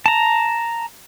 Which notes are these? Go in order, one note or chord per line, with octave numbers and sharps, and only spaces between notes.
A5 A#5